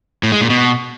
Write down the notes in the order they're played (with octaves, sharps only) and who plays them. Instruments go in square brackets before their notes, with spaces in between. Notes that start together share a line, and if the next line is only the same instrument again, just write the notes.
[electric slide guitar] A2
G#3
A#2
B2